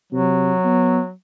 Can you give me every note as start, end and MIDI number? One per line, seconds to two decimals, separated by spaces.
0.12 0.53 48
0.12 1.12 54
0.65 1.00 59